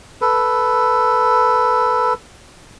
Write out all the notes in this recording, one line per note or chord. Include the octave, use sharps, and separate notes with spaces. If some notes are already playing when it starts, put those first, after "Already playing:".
A4 B4